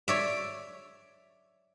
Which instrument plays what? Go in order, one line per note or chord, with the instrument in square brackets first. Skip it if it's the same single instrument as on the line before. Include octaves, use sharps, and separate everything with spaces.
[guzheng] C#5 D5 E5